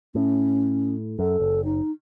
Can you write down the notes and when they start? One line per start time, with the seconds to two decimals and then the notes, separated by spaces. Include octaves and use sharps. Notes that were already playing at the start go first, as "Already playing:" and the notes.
0.15 A2 C#4
1.19 F#2 A4
1.40 F#1
1.64 D#4